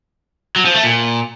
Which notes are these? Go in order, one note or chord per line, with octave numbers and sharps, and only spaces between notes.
F#3
F3
A3
A#2